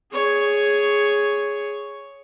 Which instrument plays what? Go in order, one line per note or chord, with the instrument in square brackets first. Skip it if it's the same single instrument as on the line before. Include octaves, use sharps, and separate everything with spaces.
[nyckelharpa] G#4 C#5